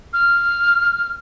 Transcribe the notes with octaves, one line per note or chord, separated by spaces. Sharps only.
F6